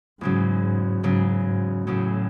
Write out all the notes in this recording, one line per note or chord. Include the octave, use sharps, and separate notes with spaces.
E2 G#2 C#3 F#3
E2 G#2 C#3 F#3
G#2
E2 A2 C#3 F#3